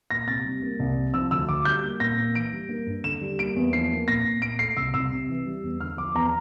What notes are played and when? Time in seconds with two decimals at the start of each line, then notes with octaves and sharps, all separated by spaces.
0.11 A#2 A#6
0.27 C3 A6
0.45 G3
0.62 A#3
0.80 C2
0.97 C3
1.14 F3 E6
1.31 D2 E6
1.49 D2 D6
1.65 G3 G6
1.84 A#3
2.00 A#2 A#6
2.18 A#2
2.35 E3 D7
2.52 G3
2.69 A#3
2.86 G2
3.04 D3 E7
3.21 G3
3.39 A#3 D7
3.56 E2
3.73 F3 C7
3.90 A#3
4.08 A#2 A#6
4.25 A#2
4.42 A#2 D7
4.59 A3 C7
4.77 C2 E6
4.94 C2 E6
5.12 C3
5.29 E3
5.46 G3
5.63 E2
5.80 D3 F6
5.97 F3 D6
6.15 E2 A#5